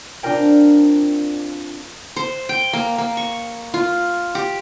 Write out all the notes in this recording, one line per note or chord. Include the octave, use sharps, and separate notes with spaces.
C4 D4 F4 A#4 G5
C5
G5
A#3
A#3
C#6
F4
G4